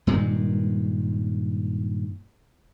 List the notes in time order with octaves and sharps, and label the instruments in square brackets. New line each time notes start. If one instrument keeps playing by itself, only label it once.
[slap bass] G2 A#2 D#3 G#3